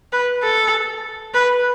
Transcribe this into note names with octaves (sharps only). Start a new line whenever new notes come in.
B4
A4
B4